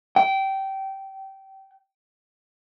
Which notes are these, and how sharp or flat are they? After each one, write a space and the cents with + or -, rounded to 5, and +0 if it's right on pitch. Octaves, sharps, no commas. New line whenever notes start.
G5 -20